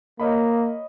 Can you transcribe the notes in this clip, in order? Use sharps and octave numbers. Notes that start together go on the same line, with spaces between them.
A#3 C#5 D#5 B5